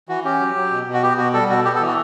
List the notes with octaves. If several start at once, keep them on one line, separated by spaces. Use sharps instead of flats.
E3 F#4
C#4 G4
F#3
F#3
B2
B2
F#4
B3 G4
B2 F#4
G3 A4
B2 F#4
B3 G4
A4
E3
F#4